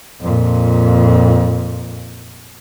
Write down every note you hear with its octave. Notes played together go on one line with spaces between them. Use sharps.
F2 A#2